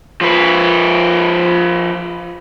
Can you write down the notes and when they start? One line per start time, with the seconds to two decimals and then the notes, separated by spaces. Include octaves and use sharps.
0.21 F3 B4